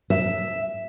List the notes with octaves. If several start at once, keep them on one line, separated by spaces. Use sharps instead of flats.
E5